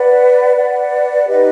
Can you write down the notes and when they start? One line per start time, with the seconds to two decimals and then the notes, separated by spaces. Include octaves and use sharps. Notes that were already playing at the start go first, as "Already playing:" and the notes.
Already playing: B4 D5 F#5
0.56 B4 D5 F#5
1.28 D#4 G4 B4 D#5